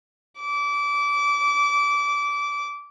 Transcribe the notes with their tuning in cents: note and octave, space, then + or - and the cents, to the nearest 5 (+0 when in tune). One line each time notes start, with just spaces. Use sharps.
D6 -25